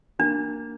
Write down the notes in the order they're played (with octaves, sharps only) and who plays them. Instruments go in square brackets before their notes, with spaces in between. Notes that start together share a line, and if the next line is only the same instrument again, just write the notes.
[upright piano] A#3 [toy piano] D4